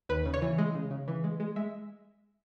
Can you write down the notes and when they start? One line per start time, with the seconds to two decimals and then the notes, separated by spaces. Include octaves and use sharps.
0.09 D#2 B4
0.25 C#3
0.34 C#5
0.42 E3
0.58 G#3
0.75 C#3
0.91 C#3
1.08 E3
1.24 G#3
1.40 G#3
1.56 G#3 E5